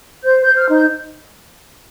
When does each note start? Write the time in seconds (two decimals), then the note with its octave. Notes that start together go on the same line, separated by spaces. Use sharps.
0.24 C5 G6
0.41 G6
0.46 C5
0.57 F6
0.69 D#4 G6